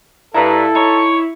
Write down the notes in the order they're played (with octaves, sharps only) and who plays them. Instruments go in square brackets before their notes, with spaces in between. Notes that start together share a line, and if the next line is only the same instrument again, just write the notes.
[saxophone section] G2 [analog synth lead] E4 [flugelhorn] A4 [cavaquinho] A#4 A5 A#5
[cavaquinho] D#4 C6 [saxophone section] C#5